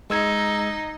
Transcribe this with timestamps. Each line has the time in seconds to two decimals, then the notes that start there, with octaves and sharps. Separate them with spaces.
0.10 G#3 D#4 E6 G#6